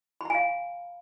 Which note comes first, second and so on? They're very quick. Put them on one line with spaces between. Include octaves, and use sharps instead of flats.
B5 A#5 G#5 F5